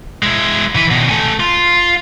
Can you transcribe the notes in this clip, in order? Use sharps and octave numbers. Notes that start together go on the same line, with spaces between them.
G#3 E4
E3 B4
B2 D#3
A3 G#5
F4